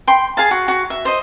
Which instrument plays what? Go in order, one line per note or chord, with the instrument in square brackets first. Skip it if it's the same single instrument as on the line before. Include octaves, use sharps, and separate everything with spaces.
[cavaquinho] G5 B5 C6
G#4 F5 A5
F#4
F#4
E5
C5 D#5